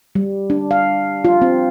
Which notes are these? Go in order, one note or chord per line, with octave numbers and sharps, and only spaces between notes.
G3
D4
F5
F4
C4